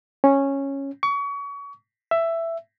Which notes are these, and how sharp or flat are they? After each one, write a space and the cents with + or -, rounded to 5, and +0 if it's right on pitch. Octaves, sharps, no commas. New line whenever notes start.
C#4 -10
C#6 +30
E5 +10